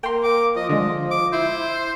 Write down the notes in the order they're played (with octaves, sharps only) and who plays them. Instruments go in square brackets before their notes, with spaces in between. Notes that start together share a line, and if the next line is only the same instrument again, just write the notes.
[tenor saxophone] A#3 [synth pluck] G5 C6
[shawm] D6
[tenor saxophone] F3 [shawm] D#5
[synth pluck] D3 G#3 [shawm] D#5
[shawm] D6
[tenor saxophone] E4 [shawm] C5